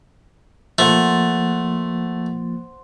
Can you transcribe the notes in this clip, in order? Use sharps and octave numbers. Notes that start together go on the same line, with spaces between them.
F3 A3 A#3 C5 F#5 A6